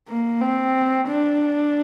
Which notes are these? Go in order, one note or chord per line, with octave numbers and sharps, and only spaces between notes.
A#3
C4
D4